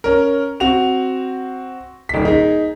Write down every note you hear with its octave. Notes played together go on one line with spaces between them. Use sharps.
C#4 A#4
C4 F#4 F7
D#1 B6
D#4 G#4